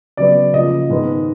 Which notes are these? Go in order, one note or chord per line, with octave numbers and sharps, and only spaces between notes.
C#3 F#3 B3 D5
C#3 F3 A#3 D#5
G#2 D#3 G#3 B3 D#4